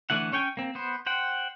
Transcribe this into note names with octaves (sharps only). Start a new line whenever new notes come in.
D3 E3 A3 E4 F#5
C#4 C#5 G5 G#5
A#3 C4
B3 C5
C5 F#5 G5